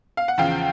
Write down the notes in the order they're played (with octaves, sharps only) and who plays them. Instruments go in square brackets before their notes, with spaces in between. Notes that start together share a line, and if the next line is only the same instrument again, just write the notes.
[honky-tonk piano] F5
F#5
E2 C#3 F3 F5 G5